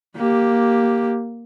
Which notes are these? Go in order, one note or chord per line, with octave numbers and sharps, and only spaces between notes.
A#3 G4